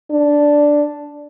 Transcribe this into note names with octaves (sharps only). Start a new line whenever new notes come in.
D4